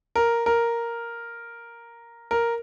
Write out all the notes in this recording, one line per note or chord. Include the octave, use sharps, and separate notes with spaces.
A#4
A#4
A#4